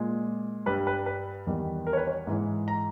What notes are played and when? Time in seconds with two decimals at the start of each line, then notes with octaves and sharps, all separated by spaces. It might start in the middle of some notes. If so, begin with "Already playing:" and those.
Already playing: A#2 G#3
0.66 G2 G3 B4
0.87 B4
1.06 B4
1.47 E2 D#3 G3
1.87 A#4
1.93 C#5
1.97 B4
2.07 C#5
2.27 G#2 E3 G#3
2.68 A#5